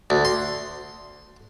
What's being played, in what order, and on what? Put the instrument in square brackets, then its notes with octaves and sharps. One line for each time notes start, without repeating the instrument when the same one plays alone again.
[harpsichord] D2
C6